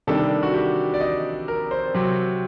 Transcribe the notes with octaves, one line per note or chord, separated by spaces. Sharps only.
C3 D#3 G3 D4 A4
F#4
G4
D5
D#5
A#4
C5
C3 F#3 C4